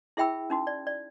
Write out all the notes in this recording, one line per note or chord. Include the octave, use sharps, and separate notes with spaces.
E4 G#4 E5 G5 B5 E6
C#4 D#4 F#4
D5
D5